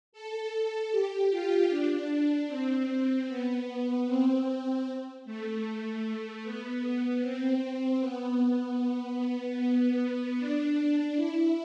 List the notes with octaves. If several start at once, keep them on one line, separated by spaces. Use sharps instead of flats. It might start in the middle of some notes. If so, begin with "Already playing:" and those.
A4
A4
G4
F4
D4
C4
B3
C4
A3
B3
C4
B3
B3
B3
B3
D4
E4